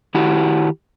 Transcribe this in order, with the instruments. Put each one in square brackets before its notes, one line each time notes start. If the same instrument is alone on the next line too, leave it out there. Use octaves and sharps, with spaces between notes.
[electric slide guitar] D#3 E4 F#4 G4